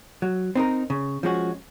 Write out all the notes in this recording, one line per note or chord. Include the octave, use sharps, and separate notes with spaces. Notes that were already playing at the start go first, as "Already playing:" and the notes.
F#3
C4 D#4 A#4
C#3
F3 G#3 C#4 F#4